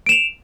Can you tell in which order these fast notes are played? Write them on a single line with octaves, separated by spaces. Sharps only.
D7 E7 F7